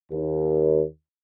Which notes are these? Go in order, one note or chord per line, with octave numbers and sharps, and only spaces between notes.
D#2